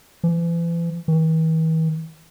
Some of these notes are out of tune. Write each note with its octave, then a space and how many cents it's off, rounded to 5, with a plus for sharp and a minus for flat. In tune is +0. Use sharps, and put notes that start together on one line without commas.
E3 +40
E3 -45